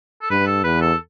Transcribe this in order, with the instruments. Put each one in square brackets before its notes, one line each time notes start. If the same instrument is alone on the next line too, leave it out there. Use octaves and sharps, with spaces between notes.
[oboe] A4
[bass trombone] G2 [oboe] B4
[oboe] A4
[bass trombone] E2 [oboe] B4
[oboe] A4